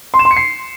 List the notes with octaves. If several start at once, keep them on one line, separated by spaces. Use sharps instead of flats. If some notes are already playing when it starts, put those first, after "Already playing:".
C6
E7
C6
C#7
C7